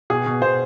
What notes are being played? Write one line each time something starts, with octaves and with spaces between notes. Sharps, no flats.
B2 G#4
B2
B2 C5